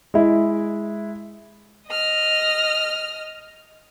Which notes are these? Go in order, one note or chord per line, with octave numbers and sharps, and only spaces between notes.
G#3 E4
D#5 F6